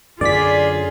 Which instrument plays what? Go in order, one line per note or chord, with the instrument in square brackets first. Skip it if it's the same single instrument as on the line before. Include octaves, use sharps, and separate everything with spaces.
[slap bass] F#2 D3 [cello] F4 G#4 [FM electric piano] D5 B6